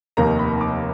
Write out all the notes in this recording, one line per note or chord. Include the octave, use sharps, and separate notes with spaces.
F1 D#2 D#3 A#3 A#5
B5
D6